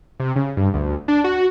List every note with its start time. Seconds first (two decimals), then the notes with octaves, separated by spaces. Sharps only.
0.20 C3
0.36 C#3
0.57 G2
0.74 D2
1.08 D4
1.24 F#4